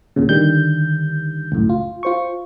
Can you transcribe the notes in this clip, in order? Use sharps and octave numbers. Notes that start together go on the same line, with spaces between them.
D2 A#2 C#3
D3 D#3 G3 G6
C#2 F#2 A2
F4
F4 C5 C#6